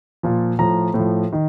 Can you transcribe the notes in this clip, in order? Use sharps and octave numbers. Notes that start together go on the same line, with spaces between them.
A#2 F3
A2 F3 A#5
A2 F3
D#3